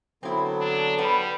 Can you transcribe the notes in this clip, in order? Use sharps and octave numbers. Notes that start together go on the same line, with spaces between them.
D3 F#3 B3 C4 E4
D4
G3 F#4 B4